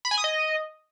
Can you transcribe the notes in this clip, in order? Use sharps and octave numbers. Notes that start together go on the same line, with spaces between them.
B5
G#5
D#6
D#5